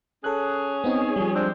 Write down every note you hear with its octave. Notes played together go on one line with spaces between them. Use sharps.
C#4 G#4 A4 F#6
B3 C4 D#4
F3 G3
G#3 C4 D4